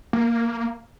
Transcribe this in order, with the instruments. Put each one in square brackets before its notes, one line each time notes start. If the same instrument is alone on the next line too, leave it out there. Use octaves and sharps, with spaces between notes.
[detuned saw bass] A#3